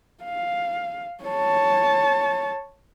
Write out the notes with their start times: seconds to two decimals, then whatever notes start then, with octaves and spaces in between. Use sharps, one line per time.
0.24 F5
1.24 C#5 A5